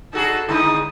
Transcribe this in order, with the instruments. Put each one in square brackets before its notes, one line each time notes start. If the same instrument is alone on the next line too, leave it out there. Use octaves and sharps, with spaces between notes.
[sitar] D#4 F#4 G#4 [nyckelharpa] A4
[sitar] D3 G#3 D#4 [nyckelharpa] E4 D#6